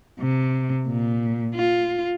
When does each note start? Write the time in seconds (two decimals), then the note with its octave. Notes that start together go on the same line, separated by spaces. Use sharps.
0.20 C3
0.87 A#2
1.54 F4